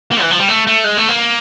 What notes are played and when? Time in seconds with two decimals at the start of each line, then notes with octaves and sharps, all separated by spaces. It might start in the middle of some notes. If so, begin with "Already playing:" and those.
0.12 A#3
0.21 E3
0.31 F3
0.39 G3
0.48 A3
0.67 A3
0.84 G#3
0.97 A3
1.09 A#3